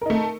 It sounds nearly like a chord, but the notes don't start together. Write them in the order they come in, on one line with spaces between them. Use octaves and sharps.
A#4 D#4 A3